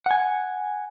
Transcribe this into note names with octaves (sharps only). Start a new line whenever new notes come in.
F#5 G#5